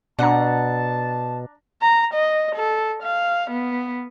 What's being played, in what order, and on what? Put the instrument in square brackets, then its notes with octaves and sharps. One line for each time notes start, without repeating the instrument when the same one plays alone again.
[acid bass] B2 [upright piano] D4 A#5 [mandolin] F#5 [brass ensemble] A5
[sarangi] A#5
D#5
A4
F5
B3